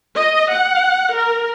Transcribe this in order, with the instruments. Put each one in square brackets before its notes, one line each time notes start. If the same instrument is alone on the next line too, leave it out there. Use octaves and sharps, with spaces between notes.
[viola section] D#5
F#5
A#4